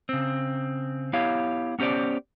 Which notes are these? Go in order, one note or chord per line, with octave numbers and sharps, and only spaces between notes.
C#3 C4
B3 E4 G4 C#5 F5
B3 C#4 G4 C5 D5